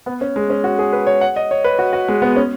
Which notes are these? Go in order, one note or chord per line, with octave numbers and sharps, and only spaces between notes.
B3
C#4
G#3
C#4
F#4
G#4
B4
C#5
F#5
D#5
C#5
B4
F#4
F#4
G#3
B3
C#4